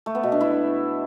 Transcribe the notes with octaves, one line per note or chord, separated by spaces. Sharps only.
A3
B3
B2
D4
E4